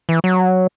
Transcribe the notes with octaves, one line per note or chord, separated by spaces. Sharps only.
E3
F#3